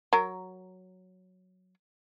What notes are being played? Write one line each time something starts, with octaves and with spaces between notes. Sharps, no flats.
F#3 A#4